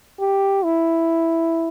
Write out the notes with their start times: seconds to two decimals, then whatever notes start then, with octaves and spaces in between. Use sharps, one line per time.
0.20 G4
0.64 E4